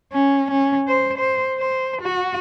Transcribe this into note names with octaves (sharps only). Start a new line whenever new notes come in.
C#4
C#4
C5
C5
C5
F#4